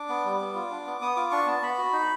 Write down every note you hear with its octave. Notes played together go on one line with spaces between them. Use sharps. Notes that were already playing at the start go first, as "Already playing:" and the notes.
Already playing: D4 D6
B3
G3
B3
F4
D4
B3
B3 D#6
F4 D6
D4 C#6
B3 A5
B3 B5
F#4
D#4